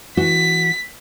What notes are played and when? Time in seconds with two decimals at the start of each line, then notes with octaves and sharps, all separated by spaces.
0.17 E3 F#4 B6